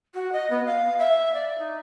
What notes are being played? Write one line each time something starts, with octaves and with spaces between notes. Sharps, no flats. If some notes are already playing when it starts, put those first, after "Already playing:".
F#4
D#5
B3
F5
E5
D5
D#4